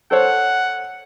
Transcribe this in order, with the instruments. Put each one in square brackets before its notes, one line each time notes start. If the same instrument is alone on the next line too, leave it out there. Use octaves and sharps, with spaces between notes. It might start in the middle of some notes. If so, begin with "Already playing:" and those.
[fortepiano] A4 C5 C#5 [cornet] F#5